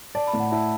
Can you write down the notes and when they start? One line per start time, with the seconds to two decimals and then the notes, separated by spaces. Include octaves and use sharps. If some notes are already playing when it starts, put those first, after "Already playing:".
0.15 D5 A5
0.27 B5
0.33 A2
0.40 F#5
0.52 E4 A5